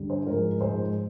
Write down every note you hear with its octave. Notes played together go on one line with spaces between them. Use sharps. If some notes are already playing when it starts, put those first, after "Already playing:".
Already playing: G2 D3 G3
C5
G#2 F3 G#3 A#4
G#2 F3 G#3 C5